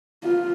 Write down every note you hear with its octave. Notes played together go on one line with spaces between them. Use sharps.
F4